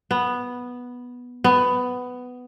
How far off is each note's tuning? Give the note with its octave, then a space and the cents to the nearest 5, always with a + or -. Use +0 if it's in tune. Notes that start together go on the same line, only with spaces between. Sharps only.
B3 -5
B3 +10